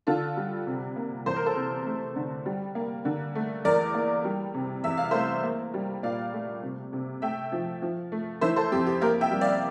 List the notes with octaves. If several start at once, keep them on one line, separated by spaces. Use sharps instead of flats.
D3 F4 A4
G3
C3
A#3
E2 C5
A#4
A4 C5
C3
A3
D3
G3
A#3
D3
A3
E2 A#4 D5
A#3
G3
C3
E2 E5
F5
A3 C5 E5
A#3
G3
A#2 D5 F5
A3
C3
C3
A3 E5 G5
F3
F3
A3
E3 C5 E5
A4 C5
F2 G4
G4
A#3 G4 A#4
E5 G5
G3
D5 F5